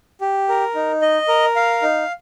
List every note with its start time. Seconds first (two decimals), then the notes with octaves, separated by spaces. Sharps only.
0.21 G4
0.49 A#4
0.75 D#4
1.02 D#5
1.28 A#4
1.56 F5
1.82 D#4